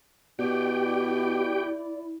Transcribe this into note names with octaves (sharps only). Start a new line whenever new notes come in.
B2 E4 G4 D5 G5